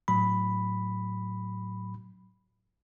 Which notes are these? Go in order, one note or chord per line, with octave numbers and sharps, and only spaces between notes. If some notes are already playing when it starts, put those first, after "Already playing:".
A2 F#3 B5